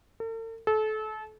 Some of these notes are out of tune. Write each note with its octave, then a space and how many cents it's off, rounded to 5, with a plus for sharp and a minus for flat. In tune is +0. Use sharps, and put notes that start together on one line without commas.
A4 +45
A4 -30